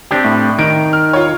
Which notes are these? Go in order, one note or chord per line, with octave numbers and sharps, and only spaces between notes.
C4 D4 G4
A2
D#3 D7
F6
F4 C#5